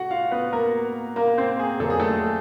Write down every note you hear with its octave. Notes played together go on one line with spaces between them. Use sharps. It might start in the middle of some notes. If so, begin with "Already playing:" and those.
Already playing: A3 F#4 F#5
F4 F5
B3 B4
A#3 A#4
A#3 A#4
C4 C5
G#4
F2 D3 F#3 A#3 A4
G#4
A3 A4